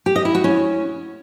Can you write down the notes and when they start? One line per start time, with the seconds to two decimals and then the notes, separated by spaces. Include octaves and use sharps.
0.06 G4
0.16 D#5
0.25 E4
0.35 F#4
0.44 C#4